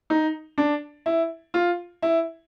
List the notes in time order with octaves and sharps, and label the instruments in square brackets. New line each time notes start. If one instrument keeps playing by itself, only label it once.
[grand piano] D#4
D4
E4
F4
E4